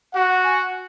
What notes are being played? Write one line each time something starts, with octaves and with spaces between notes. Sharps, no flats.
F#4 F#5
G#5